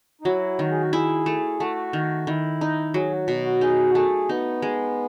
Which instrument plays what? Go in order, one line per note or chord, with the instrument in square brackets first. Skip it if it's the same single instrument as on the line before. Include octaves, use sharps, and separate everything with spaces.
[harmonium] D#4
[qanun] F#3 [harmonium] E4
[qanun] D#3 [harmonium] F#4
[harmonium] G#4
F#4
[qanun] E4 [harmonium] G#4
[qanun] A3
[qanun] A3 [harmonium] F#4
[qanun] D#3
[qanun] D#3 [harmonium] E4
[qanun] D#4
[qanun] F#3 [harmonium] G#4
[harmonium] F#4
[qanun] B2
[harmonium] F#4
[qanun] D#4 [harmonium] G#4
[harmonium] F#4
[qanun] A3 [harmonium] G#4
[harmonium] B3 [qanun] D#4
[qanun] G#3